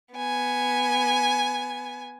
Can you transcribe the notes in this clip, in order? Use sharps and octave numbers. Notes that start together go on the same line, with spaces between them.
B3 G#5